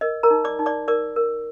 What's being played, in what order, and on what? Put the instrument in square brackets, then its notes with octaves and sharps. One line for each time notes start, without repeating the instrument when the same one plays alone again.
[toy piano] A#4 D#5
A#4 A#5
D#4
D5 D6
D#4
D5 D6
A#4 D5 D6
A#4